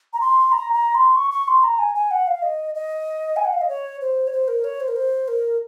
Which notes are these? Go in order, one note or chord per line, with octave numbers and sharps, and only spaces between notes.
A#5
C6
A#5
A#5
C6
C#6
C#6
C6
A#5
G#5
G#5
F#5
F5
D#5
D#5
G#5
F#5
F5
D#5
C#5
C5
C#5
C5
A#4
C#5
C5
A#4
C5
A#4